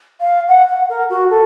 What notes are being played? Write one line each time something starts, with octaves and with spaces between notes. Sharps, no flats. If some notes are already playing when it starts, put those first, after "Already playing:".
F5
F#5
F#5
A#4
F#4
A4